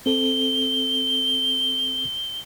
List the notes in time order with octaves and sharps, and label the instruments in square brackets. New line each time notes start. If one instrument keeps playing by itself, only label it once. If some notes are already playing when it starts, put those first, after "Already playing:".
[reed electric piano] C4 A4 [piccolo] G7